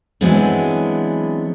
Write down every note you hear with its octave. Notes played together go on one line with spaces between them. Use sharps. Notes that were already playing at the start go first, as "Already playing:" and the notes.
E3 F#3 G#3 B3 C4 D4